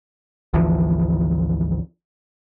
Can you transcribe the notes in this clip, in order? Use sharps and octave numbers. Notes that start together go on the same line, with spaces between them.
G#1 D2 E3 F3